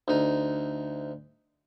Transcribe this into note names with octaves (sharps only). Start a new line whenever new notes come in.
D2 D#4